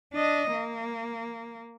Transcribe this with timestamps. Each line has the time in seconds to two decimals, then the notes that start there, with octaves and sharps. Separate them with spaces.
0.14 D4 D#5
0.52 A#3